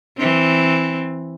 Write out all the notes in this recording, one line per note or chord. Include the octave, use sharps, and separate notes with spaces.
E3 C4